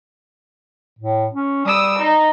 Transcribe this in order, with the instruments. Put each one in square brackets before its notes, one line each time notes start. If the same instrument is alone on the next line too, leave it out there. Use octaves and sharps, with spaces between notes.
[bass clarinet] A2
C#4
[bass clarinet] G3 [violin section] D#6 E6
[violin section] D#4